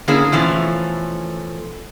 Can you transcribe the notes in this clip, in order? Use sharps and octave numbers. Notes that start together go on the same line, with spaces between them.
D3 A#3 C#4 E4 G#4
B2 E3 F3 A3 C#4